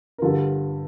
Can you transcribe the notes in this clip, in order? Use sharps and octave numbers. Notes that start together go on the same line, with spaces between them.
A#4
G1 G2 D3 F4 A4